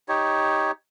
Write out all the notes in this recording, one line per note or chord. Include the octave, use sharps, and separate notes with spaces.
D#4 G4 C#5